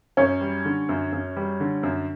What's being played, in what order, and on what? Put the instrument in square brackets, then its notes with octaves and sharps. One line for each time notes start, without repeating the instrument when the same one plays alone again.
[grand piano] F#2 [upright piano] C#4
[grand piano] G3
D3
F#2
F#2
G3
D3
F#2